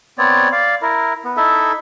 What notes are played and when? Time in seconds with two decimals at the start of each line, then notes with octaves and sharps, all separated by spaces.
0.18 B3 C4 C#5 D5
0.52 D5 F5
0.82 E4 A#4
1.25 B3
1.37 D#4 E4 A4 E5